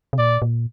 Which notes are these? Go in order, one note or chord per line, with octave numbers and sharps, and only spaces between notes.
C3
A#2 D5
A#2